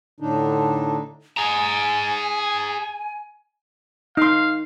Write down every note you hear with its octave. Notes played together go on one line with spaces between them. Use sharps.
A2 D3 D4 D#4
G#4 G#5 A#5
D#4 F5 C6